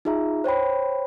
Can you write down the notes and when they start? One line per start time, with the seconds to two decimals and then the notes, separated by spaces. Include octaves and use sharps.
0.05 D#4 F4 G#4 E5 A#5
0.44 C5 C#5 G5 B5